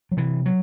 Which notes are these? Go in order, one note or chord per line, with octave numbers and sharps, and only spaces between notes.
F#3
C3 E3
F#3